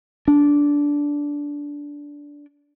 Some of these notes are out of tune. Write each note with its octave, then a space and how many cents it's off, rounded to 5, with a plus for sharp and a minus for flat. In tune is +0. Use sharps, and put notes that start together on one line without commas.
D4 -15